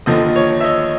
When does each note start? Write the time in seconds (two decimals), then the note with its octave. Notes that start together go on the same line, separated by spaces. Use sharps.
0.06 D#2 D3 F3 D#5
0.36 C#5
0.60 E5
0.64 D#5